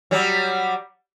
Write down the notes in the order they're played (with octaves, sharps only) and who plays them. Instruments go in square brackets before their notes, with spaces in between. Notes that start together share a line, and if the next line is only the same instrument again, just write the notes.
[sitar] F#3 G3